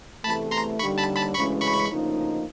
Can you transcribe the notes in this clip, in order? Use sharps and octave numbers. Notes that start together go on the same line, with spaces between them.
E2 C3 E3 A3 A5 B5
A#5 C6
D#2 D3 G3 B5 C#6
A5 B5
A5 B5
D2 C#3 E3 G#3 C#4 B5 C#6
B5 C#6
D2 C#3 F3 A#3 D#4